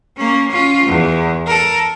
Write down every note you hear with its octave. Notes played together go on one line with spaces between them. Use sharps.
A#3 C#4
C#4 F4
E2
A4 A#4